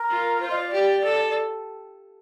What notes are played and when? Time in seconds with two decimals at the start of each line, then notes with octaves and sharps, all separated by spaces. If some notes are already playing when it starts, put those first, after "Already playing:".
Already playing: A#4
0.09 F4
0.40 F4 C5
0.51 D#5
0.57 D5
0.72 G4
1.04 A4